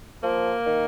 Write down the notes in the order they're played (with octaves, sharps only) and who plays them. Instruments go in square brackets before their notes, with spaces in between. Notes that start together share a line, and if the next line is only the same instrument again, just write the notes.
[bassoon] F3 [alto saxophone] A#3
[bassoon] D#3